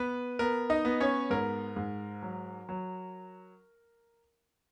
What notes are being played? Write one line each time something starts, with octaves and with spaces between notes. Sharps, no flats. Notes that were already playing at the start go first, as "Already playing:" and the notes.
Already playing: B3 B4
B3 A#4
D#4 D#5
B3
C#4 C#5
G#2 A#4
G#2
F#3
F#3